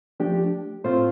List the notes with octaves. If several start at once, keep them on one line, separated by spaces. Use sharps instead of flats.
F3 A3 D4 G4
A2 A3 C4 F4 C5